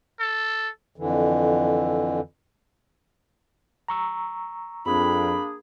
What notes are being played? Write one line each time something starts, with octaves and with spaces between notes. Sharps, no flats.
A4
F2 D3 E3
A#5 C#6 E6
F2 A#3 D4 G#4 B5